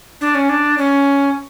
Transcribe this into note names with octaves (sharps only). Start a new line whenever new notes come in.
D4
C#4
D4
C#4